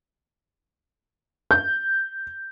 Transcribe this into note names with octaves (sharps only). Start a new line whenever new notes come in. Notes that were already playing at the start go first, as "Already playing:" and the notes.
G6